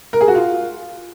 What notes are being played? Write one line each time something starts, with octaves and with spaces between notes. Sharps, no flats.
A#4
G#4
F#4
F4